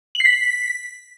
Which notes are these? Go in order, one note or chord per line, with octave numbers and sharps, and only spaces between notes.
F#7
C7
B6